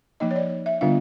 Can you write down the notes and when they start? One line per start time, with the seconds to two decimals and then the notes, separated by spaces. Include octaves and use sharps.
0.20 F3 A#3 D#4 D#5
0.31 C#5
0.36 D5
0.66 E5
0.81 D3 G3 B3 D4 F4 F5